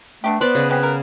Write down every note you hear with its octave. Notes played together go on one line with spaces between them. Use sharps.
A3 B3 D4 G4
B3 B4 C5 D5 B5
C#3
F#3 C4 C#4 B4
A#4